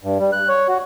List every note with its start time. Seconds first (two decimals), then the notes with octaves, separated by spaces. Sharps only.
0.03 G2
0.19 G3
0.33 F#6
0.48 C#5
0.68 F#4